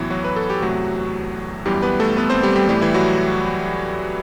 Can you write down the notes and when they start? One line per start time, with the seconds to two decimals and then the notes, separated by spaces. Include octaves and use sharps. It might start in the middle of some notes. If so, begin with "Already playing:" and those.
Already playing: A2 E3 F#3 B3 E4
0.10 F#3 F#4
0.25 B4
0.36 A4
0.50 G4
0.62 E2 C3 F#3 A3 F#4
1.66 F#2 E3 G3 B3 G4
1.82 B3 B4
2.00 A3 A4
2.17 B3 B4
2.30 C4 C5
2.43 G3 G4
2.56 G3 G4
2.69 A2 E3 G3 A3 G4
2.81 E3 E4
2.94 F#3 F#4